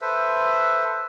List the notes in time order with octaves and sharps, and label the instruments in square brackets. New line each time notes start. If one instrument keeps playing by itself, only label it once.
[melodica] A4 B4 C5 E5